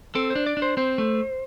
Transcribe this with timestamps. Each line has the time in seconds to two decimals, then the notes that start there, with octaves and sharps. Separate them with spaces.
0.15 C4 A4
0.30 C5
0.35 D4
0.46 D5
0.57 D4
0.62 C5
0.77 C4 C5
0.98 A3